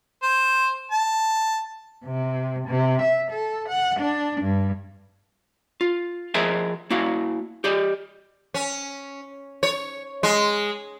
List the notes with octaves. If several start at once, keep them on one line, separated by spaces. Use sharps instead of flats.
C5
A5
C3
C3
E5
A4
F#5
D4
G2
F4
F3 G#4 A#4 C5 D#5 E5
A#3 E4 F#4 F5
G4 D5 D#5
C#4
C#5
G#3